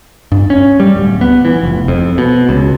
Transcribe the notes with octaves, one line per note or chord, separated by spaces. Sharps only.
G2
C#4
G3
D1
B3
E3
F1
F2
B2
C#2